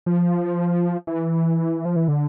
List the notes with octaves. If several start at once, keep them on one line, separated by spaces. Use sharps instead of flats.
F3
E3
F3
E3
D3